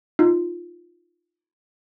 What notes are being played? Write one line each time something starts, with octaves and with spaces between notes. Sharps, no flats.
D#4 F4